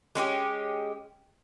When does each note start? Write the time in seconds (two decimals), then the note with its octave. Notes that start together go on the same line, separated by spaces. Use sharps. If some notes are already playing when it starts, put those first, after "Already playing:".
0.15 G#3 C#4 E4 G4